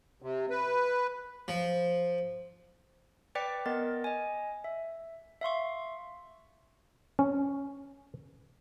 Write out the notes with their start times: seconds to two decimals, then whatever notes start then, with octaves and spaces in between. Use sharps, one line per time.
0.22 C3
0.50 B4
1.48 F3
3.35 B4 D5 G5 D6 B6 C#7
3.66 B3 A#4 D#5 A6
4.04 D#5 G#5
4.64 E5
5.41 E5 F5 C6 C#6
7.19 C#4